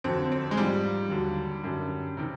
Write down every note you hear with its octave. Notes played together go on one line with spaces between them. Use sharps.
F2 D3 F#3 C4
C4
G#3
G#2 F3 G3
D#2 D3 F#3
F#2 D3 F#3
C3 D#3